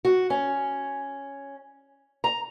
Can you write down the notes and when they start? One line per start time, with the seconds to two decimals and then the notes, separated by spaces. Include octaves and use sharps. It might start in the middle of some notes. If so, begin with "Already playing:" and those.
0.05 F#4
0.30 C#4
2.24 A#5